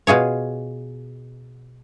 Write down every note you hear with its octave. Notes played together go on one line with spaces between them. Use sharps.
B2 F4 G#4 C#5